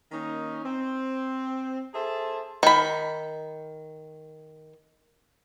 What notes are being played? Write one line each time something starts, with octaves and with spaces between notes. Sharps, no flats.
D#3 A#3 C#4 D#4
C4
G#4 A4 C5 E5 A5
D#3 B5